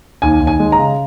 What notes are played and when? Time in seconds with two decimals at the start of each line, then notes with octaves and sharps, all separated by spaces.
0.22 D#2 G#5
0.41 D#2
0.47 G#5
0.60 G#3
0.72 A#5
0.79 C#3